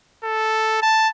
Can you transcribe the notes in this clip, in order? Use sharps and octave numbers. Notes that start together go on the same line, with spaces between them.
A4
A5